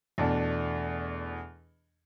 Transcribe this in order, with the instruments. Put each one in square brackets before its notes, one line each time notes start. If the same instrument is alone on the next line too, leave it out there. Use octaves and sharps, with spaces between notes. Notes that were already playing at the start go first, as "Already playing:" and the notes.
[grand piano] E2 B2 A3 D4